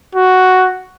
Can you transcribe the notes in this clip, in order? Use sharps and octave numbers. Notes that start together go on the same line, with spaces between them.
F#4